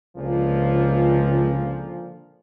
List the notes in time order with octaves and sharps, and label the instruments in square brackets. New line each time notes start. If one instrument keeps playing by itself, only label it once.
[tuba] C#2 [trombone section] A#2 D3 F3